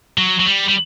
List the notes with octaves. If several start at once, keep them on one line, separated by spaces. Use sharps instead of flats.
F#3
F#3
G3
G3